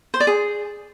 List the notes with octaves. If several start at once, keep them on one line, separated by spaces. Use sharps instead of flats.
C5
D5
G#4